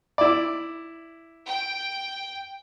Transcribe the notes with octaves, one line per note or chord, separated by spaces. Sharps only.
E4 D5
G5